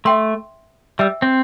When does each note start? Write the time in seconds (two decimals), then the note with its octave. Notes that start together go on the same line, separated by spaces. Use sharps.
0.05 A3 E5 G5 C6
0.99 G3 E5 G5 E6
1.22 C4